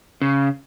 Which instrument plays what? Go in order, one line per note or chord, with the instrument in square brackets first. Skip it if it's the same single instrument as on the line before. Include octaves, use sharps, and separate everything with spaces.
[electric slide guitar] C#3